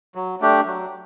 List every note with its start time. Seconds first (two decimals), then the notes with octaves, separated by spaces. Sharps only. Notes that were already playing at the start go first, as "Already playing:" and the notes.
0.15 F#3
0.41 A3 D4 G4
0.66 F#3